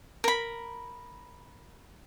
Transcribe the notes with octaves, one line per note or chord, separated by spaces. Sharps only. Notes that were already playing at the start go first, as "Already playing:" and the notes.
A#4 B5